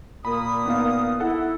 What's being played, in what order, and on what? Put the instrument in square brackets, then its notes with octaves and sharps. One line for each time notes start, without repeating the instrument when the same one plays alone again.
[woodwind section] A#2 D#6 [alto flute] A#3 [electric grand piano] B5
[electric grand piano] B3 D#4 F5
[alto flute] E4 [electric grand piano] A4 F#5